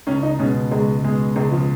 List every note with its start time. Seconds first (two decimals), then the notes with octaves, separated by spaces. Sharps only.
0.07 C#2 C#4
0.23 D#4
0.39 B2 G#3 C#4
0.71 C#2 G#3
1.03 B2 G#3
1.36 C#2 G#3
1.52 F3